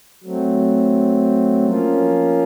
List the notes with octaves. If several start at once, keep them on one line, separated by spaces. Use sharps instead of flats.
F#3 A3 C4
F3 A#3 C#4 F4